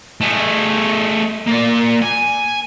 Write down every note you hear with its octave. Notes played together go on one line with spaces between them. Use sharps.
A3 G#4
A#3 D5
G#5